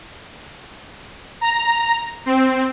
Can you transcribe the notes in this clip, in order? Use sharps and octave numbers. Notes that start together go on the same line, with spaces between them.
A#5
C4